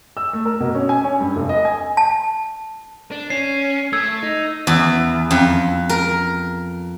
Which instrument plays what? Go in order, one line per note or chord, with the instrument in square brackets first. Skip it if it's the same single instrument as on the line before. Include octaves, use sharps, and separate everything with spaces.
[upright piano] E6
A3
A#4
B2
C#4
G#5
C#4
G2
F1
D#5
G#5
[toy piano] A5
[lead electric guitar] D4
[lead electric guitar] C#4 [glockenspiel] C7
[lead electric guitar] A3 [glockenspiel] E6 G#6
[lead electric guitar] D#4
[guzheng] E2
F2
A#4